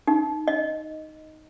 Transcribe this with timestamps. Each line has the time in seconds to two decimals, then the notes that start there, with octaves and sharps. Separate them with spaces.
0.07 D#4
0.48 D#5